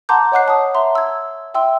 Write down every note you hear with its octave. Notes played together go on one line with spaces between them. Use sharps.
F#5 A5 A#5 C6 D6 G6
C#5 D#5 F#5 D6 F#6 C7
A5 D#6
E5 A#5 C6
E6 G#6
E5 G5 C6 E6